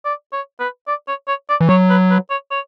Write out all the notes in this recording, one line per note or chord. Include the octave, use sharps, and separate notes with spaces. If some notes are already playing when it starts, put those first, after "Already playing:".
D5
C#5
B4
D5
C#5
C#5
D5
E3
F#3 C#5
B4
B4
C#5
C#5